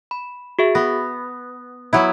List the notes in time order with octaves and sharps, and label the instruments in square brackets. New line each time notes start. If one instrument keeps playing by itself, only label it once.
[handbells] B5
F#4 G#4 E5
[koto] B3 [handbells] A#6
[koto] F#3 B3 E4